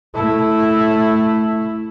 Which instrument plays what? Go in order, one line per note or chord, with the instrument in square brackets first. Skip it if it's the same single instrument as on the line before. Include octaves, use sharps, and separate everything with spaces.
[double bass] A3 E4